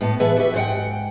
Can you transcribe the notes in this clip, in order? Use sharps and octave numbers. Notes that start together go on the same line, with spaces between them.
A2 B3 A5
E3 B3 G#4 B4 E5 A5
F#4 G4 B4 E5
G#2 F4 C5 F#5 G5